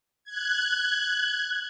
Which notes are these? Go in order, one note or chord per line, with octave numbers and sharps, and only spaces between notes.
F#6 G#6